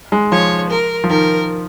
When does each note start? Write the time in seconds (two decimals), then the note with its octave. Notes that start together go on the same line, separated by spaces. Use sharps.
0.12 G#3
0.32 F3 C#5
0.70 A#4
1.04 F3
1.10 D#3 A#4